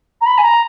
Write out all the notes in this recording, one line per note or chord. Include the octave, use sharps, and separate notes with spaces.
A#5
B5
G#5
A#5